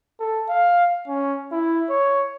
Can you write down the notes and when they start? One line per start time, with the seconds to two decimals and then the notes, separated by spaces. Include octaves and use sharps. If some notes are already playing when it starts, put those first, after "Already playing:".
0.20 A4
0.49 F5
1.08 C#4
1.52 E4
1.90 C#5